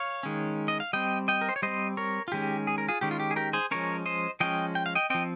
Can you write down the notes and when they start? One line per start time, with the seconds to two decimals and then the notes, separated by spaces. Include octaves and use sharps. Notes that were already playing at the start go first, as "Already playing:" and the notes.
Already playing: C#5 F5
0.23 D#3 G#3 C#4
0.68 D#5
0.80 F5
0.93 G3 C4 D#5 G5
1.28 D#5 G5
1.41 A#4
1.49 C5
1.56 C#5
1.62 G3 C4 C5 D#5
1.97 A#4 C#5
2.28 F4
2.32 D#3 G#3 C#4 G4
2.67 G#4
2.78 A#4
2.88 F4 G#4
3.01 D#3 G#3 C#4 G4
3.11 F4
3.20 G4
3.31 G#4
3.36 G4 A#4
3.53 G#4 C5
3.71 F3 G#3 C#4 A#4 C#5
4.06 C5 D#5
4.40 F3 G#3 C#4 D#5 G5
4.75 G5
4.86 F5
4.95 D#5 G5
5.10 F3 C4 D#5 G5